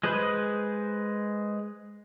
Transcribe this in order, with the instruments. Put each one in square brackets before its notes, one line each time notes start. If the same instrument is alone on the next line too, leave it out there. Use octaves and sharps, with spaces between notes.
[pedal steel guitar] G#3 G#4 B4 C5 B5